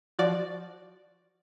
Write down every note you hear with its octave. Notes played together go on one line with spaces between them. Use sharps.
F3 F#4 D5